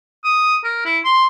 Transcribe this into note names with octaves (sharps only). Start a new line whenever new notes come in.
D#6
A#4
E4
C6